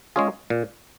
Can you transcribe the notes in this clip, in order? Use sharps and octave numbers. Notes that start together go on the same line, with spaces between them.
G#3 C#4 F4 G#4
A#2